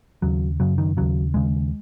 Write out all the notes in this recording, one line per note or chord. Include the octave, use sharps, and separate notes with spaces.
D#2 C#3 F#3
F#2 C#3 F#3
D#3
D#2 C#3 F#3
D#2 C#3 G#3